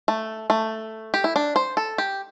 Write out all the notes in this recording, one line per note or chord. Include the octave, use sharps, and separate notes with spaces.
A3
A3
G4
E4
D4
C5
A4
G4